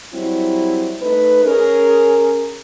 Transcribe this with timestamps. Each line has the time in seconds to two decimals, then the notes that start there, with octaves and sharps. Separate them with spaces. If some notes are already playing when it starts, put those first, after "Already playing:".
0.14 F#3 G3 C4 E4
1.01 A3 D#4 B4
1.44 C#4 G#4 A#4